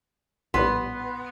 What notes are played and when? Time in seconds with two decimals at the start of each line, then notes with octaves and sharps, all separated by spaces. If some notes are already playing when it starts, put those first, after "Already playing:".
0.54 A#1 A2 G3 B3 B4 C6